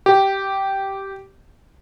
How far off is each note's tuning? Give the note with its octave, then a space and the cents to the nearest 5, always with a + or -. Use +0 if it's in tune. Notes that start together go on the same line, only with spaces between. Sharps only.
G4 -10